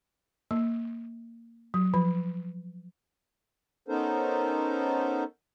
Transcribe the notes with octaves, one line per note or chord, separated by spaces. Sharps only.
A#3
F#3
F3
B3 C#4 D#4 A4 A#4 C5